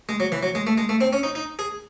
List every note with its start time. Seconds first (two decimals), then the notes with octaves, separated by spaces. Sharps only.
0.09 G#3
0.20 F#3
0.32 E3
0.43 F#3
0.55 G#3
0.67 A3
0.78 G#3
0.89 A3
1.01 C4
1.13 C#4
1.23 D#4
1.35 D#4
1.59 G#4